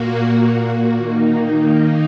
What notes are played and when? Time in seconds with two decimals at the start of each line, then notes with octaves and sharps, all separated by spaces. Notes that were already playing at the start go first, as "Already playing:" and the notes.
Already playing: A#2 A#3 F#4
0.97 D#3 A#3 D#4